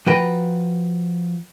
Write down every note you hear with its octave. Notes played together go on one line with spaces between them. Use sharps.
F3 F#4 B4 G5 A#5